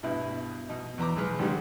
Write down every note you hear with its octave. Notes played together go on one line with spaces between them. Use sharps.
G2 B2 E4 B4
B2 D#4
E2 B4 A#5 D6
B1 G#3 B4 F6
G#1 G#2 D3 G3 G#3